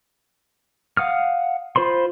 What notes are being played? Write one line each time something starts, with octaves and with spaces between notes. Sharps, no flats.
F5 F#5 D#6 F6
F4 C5 B5 C6